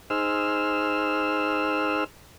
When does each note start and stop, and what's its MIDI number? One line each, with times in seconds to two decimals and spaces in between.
0.10 2.04 63
0.10 2.04 68
0.10 2.04 72
0.10 2.04 88
0.10 2.04 89